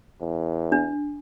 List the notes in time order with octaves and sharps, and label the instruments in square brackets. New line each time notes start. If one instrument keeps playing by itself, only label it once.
[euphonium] E2
[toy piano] D4